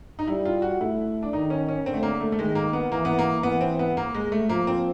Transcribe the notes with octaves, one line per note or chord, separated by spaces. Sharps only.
D#4
G3 E4
F4
F#4
A3 E4
D4
D#3 D#4
C#4
C#4
D3 C4
A3
A#3
A3
A3
D#3 G#3
A#3
B3
E3 A#3
B3
A#3
E3 B3
C4
B3
A#3
G#3
A3
F3 A#3
C4